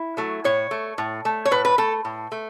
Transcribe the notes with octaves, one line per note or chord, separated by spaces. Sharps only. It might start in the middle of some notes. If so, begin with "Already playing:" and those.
Already playing: E4
F#3 A3
A2 C#5
A3
A2
A3
C#5
A2 B4
B4
A3 A4
A2
A3